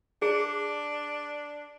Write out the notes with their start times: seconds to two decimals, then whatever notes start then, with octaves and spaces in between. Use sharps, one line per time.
0.22 D4 G#4